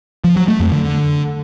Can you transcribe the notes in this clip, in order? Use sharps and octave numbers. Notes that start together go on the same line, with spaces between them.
F3
F#3
A3
F2
D3